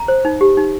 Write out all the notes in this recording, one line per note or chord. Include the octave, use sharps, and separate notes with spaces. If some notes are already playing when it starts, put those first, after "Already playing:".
Already playing: A#5
C5
D#4
G4
D#4